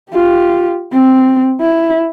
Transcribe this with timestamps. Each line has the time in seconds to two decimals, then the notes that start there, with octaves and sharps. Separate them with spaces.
0.12 F4 G4
0.93 C4
1.61 E4